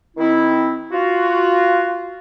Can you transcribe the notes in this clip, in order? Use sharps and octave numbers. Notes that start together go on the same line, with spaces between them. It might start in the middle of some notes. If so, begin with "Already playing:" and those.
D#3 C4 E4
F4 F#4